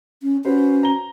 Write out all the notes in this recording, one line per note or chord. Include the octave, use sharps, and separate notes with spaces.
C#4
C#4 F#4 B4 C5
A#5 G7